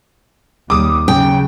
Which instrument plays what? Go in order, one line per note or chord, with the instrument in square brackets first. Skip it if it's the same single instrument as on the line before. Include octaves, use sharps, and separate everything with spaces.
[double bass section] D#2 G3 [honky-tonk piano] D6 D#6
[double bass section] C#3 F#3 [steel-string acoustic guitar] G5